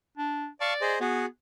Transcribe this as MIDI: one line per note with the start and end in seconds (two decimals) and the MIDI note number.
0.18 0.47 62
0.61 0.94 74
0.61 0.73 77
0.61 0.73 81
0.61 0.73 85
0.81 0.99 68
0.81 0.99 72
0.81 0.99 75
1.01 1.26 59
1.01 1.26 66
1.01 1.26 68